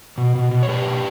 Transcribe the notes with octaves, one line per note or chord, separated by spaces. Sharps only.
B2
B2
B2
C#5
B2 G4 B4
B2